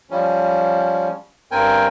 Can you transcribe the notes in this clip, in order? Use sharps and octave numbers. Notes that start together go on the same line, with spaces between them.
F3 G3 C#4
G2 C4 A#4 G5 G#5